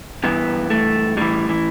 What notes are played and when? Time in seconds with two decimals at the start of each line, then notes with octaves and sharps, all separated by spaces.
0.24 G2 E3 B3
0.70 A3
1.17 A2 E3 G3
1.49 E3